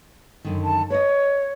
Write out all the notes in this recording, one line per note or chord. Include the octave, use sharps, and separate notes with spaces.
F#2 D3 D#3
A5
B4 C#5 D#5